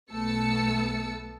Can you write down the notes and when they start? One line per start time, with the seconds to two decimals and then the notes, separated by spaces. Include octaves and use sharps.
0.11 B1 A3 B3 A5 E6 C#7